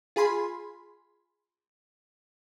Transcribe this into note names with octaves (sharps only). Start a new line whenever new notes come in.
F4 G#4 G#5 B5 C6